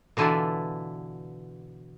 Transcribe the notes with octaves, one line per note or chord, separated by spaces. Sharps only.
B2 D3 E3 E4 F4 D5